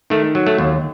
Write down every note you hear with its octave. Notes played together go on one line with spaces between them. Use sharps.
D#3 A3
F#3
A3
D#2